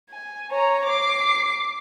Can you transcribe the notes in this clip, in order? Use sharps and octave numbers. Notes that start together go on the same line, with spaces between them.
G#5
C#5 A#5
D6 C7